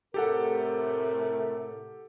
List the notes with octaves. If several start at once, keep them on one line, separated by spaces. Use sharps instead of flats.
A2 C3 A3 G4 A4 A#4 F#5